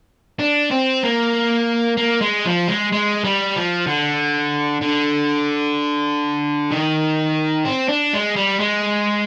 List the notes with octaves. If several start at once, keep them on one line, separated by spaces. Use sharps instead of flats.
D4
C4
A#3
A#3
G#3
F3
G#3
G#3
G3
F3
D3
D3
D#3
C4
D4
G#3
G3
G#3